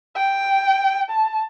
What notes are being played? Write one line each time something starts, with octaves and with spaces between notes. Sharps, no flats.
G5
A5